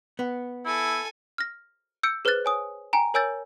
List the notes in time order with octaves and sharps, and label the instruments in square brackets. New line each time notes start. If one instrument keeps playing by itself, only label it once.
[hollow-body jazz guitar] B3
[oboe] E4 [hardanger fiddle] A4 G#5
[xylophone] F6 A#6
E6 G6 C#7 D7
G#4 B4 C5 F6 F#6 A6
C#5 G#5 D#6
G5 G#5 A#5
A#4 C#5 G#5 E6 G6 A6